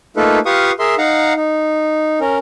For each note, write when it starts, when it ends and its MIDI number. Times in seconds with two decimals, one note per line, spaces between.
0.17 0.39 57
0.17 0.39 58
0.17 0.39 63
0.17 0.39 65
0.17 0.39 69
0.17 0.39 71
0.46 0.72 65
0.46 0.72 67
0.46 0.72 71
0.46 0.72 77
0.46 0.72 85
0.46 0.72 87
0.79 0.95 68
0.79 0.95 70
0.79 0.95 76
0.79 0.95 84
0.98 1.33 63
0.98 1.33 77
0.98 1.33 78
0.98 1.33 82
1.36 2.19 63
2.21 2.38 61
2.21 2.38 70